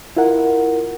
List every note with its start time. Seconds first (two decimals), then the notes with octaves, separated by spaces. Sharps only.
0.17 E4 F4 A#4 F#5